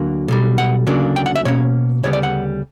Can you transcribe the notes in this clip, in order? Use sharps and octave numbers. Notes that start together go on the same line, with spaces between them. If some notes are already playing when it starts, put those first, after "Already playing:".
Already playing: D2 D3 F#3 A#3
B1 B2 G3
F#5
D2 C#3 F#3 A#3 D4
G5
F#5
E5
B2 A#3 C#4 C#5
D2 C#3 G3 B3 C#5
D5
F#5